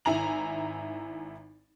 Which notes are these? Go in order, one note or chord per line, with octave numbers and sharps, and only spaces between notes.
G#1 E4 G#5 A#5 F#7